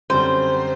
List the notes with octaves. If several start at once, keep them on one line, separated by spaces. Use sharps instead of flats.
F#2 D3 G3 C4 C5